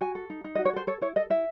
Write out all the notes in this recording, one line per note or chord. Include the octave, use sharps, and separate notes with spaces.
F#4 G#5
A4
D#4
D#4
D#5
F#4
C#5
A4 C5
A4 C#5
E4 C#5
A4 D#5
E4 E5